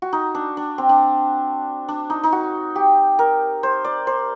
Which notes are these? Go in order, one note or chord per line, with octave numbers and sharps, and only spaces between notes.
F#4
D#4
D4
D4
C4
D4
D4
D#4
D#4
F#4
G4
A#4
C5
D5
C5